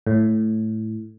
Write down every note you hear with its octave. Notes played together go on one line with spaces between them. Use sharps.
A2